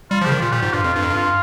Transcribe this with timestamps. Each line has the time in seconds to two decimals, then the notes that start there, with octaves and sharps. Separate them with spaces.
0.11 G3 F4
0.22 F3
0.25 C#3 G4
0.32 D#3
0.39 A#2 F4
0.52 A#2 G4
0.63 G#2
0.73 G2 F4
0.84 F2
0.95 G2 F4
1.03 F2
1.11 G2
1.16 F4